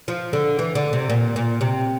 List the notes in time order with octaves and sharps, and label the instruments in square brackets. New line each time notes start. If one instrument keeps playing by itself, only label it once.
[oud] F3
D3
E3
D3
C3
A#2
A#2
C3